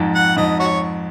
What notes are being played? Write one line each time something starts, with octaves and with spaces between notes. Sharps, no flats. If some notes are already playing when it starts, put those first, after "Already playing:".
Already playing: F2 G#2
F#5
F2 G#2 D#5
F#4 C#5